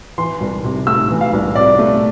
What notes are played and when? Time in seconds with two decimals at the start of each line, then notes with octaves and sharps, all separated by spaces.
0.18 E3 C6
0.41 C2
0.64 C3
0.87 A3 E6
1.10 E3
1.21 F5
1.33 C2
1.55 C3 D5
1.79 A3